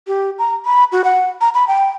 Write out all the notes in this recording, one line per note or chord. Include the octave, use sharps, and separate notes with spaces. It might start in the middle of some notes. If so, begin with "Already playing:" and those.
G4
A#5
B5
F#4
F#5
A#5
B5
G5